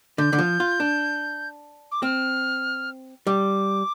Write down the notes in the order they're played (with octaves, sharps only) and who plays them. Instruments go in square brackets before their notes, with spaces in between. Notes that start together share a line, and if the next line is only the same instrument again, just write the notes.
[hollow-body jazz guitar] D3 [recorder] G6
[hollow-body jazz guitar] D3
F3
F4
D4
[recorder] D6
[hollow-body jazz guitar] C4 [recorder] F6
[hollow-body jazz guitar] G3 [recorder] D6